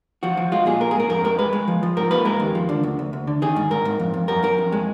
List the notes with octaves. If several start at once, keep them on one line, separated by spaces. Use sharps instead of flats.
F3 F#4
F3
G#3 F4
A#2 G#4
A#3 A#4
G#4
G#2 A#4
F2 A#4
G#3 A#4
G#3 B4
G#3
F3
F3
G#2 A#4
A#3 B4
G#3 A#4
D#2
F3
D3
D2
D2
D2
D3
D#3 G#4
G#2
G#2 A#4
G#2
F2
F2
F#2 A#4
F#2 A#4
F2
G#3